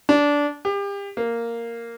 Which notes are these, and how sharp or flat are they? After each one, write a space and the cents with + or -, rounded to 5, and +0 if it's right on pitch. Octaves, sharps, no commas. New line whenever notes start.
D4 -15
G4 +35
A#3 -5